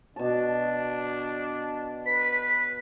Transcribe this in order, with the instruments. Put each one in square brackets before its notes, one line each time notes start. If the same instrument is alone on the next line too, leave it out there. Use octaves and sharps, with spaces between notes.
[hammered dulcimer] B2 A5 [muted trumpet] D4
[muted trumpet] B4 [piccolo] B6